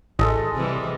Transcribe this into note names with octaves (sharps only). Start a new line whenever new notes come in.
A1 G#3 A4 D#5
C3 E3 G3